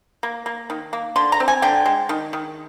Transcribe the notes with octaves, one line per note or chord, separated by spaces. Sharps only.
A#3
A#3
D#3
A#3
D3 C6
A#5
C4
G#5
D3 G5
G#3
D#3
D#3